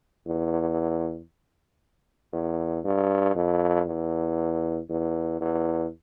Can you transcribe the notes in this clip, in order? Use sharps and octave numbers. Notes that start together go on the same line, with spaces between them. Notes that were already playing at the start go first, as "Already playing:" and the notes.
E2
E2
G2
F2
E2
E2
E2